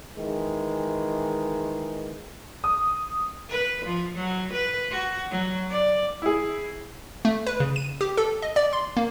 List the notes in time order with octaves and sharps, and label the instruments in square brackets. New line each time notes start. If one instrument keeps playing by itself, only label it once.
[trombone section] D#3 E3 G#3
[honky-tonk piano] D#6
[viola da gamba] B4
F3
F#3
B4
F#4
F#3
D5
[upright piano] E4 G#4
[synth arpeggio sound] A3
B4
C#3
D#7
G4
A4
D#5
D5
C6
A#3